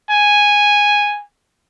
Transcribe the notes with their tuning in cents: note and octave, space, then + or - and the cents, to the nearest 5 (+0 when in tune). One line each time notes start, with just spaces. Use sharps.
G#5 -5